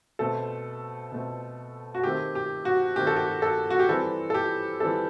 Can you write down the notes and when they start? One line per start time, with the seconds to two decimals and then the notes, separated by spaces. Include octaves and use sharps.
0.19 B2 A3 C4 A4
1.12 B2 A3 C4
1.95 F#4
2.04 D#3 A3 C4 G4
2.35 G4
2.65 F#4
2.96 D#3 A3 C4 G4
3.07 A4
3.16 G4
3.42 A4
3.70 F#4
3.79 G4
3.89 E3 G3 C4 A4
4.30 A4
4.34 G4
4.80 E3 G3 C4 A4